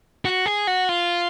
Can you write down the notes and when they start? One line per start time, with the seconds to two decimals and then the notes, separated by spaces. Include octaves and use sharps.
0.25 F#4
0.46 G#4
0.67 F#4
0.89 F4